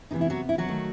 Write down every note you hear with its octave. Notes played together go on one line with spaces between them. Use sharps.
C3 E3 B3 D#4
E4
F#3 F#4
E4
F#3 F#4
D#3 A3